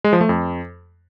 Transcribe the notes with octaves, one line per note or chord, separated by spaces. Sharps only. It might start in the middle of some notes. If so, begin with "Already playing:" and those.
G#3
F3
A3
F2